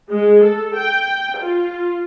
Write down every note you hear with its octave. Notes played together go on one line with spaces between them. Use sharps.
G#3
A4
G5
F4